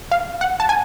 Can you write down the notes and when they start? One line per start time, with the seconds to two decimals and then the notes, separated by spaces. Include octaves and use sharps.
0.12 F5
0.41 F#5
0.60 A5
0.69 G#5